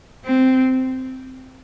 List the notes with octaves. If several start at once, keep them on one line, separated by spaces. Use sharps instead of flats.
C4